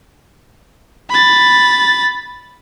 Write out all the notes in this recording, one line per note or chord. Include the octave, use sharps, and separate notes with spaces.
B5 A6